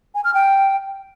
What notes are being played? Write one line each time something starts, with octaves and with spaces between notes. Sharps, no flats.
G#5
F6
G5